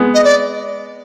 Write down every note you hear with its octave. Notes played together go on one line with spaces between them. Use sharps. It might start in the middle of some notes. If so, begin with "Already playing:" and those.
Already playing: G#3 B3
D#5
D5